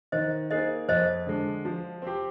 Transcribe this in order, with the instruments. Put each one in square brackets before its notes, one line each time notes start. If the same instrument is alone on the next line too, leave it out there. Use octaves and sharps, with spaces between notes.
[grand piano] D#3 [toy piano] C5 D#5
[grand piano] A#3 D#4 G#4 [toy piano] C5 D#5
[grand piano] F2 [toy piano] C5 D#5
[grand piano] D3 G#3 D4
F3
C4 G4